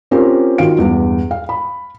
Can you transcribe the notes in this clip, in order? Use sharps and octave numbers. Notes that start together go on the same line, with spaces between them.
C4 C#4 F4 G4 A#4 C#5
D#3 F4 F#4 F5 D7
E2 G2
F5
B5